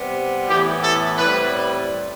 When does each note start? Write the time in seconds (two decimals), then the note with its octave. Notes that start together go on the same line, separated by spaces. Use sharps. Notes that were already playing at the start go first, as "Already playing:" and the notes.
Already playing: C3 G3 B3
0.49 A2 E3 B3 G4
0.84 A4
1.17 A2 G3 C4 B4